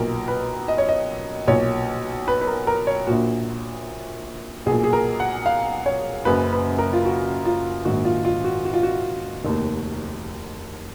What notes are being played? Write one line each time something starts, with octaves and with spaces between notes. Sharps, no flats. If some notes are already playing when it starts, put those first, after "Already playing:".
Already playing: B1 A#2 A#4
B4
D#5
C#5
D#5
B1 A#2 C#5
B4
B4
A#4
A#4
C#5
A#1 A#2 F#4
B1 A#2 G#4
G#4
A#4
F#5
F5
C#5
F#1 F#2 C#3 B4
B4
A#4
F4
F#4
F4
A#1 G#2 D#3 F#4
F4
F4
F#4
F#4
F4
F#4
F1 D#2 D#3